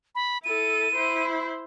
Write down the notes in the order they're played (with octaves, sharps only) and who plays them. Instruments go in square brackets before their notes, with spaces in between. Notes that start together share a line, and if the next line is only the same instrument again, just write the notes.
[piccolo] B5
[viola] E4 A4 [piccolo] D#7
[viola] E4 C5